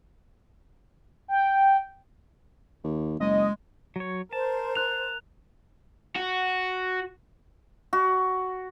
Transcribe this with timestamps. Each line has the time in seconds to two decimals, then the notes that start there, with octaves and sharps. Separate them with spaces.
1.28 G5
2.84 D#2
3.20 F#1 G#3 D#5
3.96 F#3 C#5
4.33 A#4 C5 A5
4.75 F#6 F7
6.16 F#4
7.93 F#4